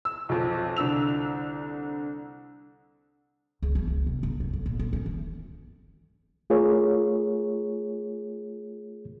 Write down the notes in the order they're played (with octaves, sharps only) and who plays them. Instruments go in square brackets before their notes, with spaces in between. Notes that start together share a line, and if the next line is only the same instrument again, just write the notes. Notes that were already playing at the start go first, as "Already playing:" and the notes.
[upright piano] E6
B1 F2
C2 D3 E6 F7
[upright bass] C#2
E3
C#2
C3
D#4
F1
F2
A#2
D2
C#4
E3
[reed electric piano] A3 F4 G#4 A#4 C#5